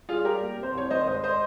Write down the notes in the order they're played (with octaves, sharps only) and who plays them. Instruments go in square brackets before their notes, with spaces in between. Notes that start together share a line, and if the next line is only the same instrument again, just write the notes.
[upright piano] G3 F4 G#4
G3 G4 A#4
A#3
C3
C5
C2 C#5
D#3 C5 D#5
G#2 C5 D#5
C5 D#5